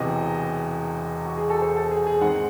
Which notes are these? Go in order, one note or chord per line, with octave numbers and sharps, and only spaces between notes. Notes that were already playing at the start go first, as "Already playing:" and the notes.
Already playing: E1 E2 C3 D#5
F#4
G#4
A4
C5
A4
G#4
G#4
G#2 D#3 G#3 C4 F#5